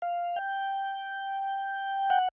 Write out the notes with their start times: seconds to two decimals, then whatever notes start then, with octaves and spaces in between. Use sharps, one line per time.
0.02 F5
0.36 G5
2.10 F#5